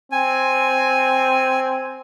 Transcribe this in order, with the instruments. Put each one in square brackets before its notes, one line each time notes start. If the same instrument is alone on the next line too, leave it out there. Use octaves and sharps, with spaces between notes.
[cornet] C4 [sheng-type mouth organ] G#5